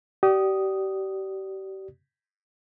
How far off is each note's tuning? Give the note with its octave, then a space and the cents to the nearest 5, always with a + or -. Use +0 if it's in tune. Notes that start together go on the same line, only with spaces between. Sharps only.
G4 -35 D5 +0 D#6 +0